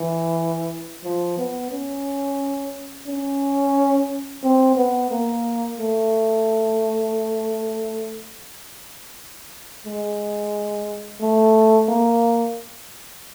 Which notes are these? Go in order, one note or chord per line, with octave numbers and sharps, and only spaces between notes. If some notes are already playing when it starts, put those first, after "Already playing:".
Already playing: E3
F3
B3
C#4
C#4
C4
B3
A#3
A3
G#3
A3
A#3